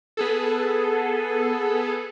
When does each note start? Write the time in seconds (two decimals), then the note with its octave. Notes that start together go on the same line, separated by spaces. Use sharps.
0.17 B3 G#4 A4